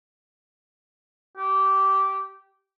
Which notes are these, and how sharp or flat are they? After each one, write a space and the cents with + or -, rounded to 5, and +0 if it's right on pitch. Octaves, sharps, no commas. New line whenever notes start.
G4 -15